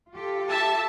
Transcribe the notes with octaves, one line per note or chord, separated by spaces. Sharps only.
F4 G4 A4
E5 A5